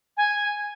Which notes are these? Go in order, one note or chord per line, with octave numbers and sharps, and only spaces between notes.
G#5